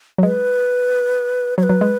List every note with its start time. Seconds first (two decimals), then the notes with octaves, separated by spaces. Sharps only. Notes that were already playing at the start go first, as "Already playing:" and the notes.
0.18 F#3
0.23 G#3 B4
1.58 F#3 C#5
1.63 B4
1.69 F#3
1.81 G#3